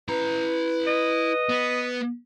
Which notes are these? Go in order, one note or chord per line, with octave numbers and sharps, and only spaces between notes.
E4 B4 A#5
D#5
B3